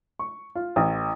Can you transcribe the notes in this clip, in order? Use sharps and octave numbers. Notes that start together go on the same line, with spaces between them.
C#6
F4
A1